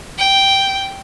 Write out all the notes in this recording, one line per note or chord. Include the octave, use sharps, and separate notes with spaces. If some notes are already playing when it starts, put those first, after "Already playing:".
G5